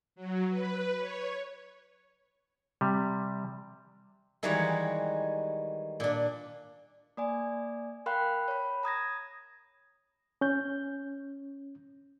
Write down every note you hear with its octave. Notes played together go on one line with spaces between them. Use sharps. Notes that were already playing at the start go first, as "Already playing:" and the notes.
F#3
B4
C#5
C3 G3
D#3 E3 G3 G#3 F#4 C#5
A#2 D4
A#3 D5 G#5
A#4 F5 G5 B5 C6 F#6
C#5 B5
A#5 D#6 G#6 A#6
C#4 G6